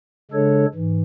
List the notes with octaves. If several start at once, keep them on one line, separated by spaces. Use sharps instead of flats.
C#3 G#3 D4 A4 C#5
G#2 E3